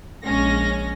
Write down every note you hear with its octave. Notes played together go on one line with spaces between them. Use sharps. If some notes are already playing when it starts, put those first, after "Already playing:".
A#1 G#3 C#4 A#6